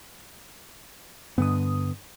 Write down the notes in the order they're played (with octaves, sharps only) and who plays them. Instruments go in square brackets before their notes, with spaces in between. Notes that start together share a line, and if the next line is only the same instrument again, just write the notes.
[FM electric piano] G2 D#6 [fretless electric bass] D3 B3